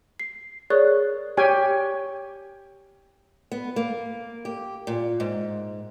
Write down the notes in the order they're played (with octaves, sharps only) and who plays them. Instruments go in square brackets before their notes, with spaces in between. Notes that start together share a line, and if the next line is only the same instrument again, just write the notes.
[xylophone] C7
G#4 A#4 C#5 D5 C#6 F#6
[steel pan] G4 C#5 G5 G#5
[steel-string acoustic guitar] B3
A#3
G4
A#2
G#2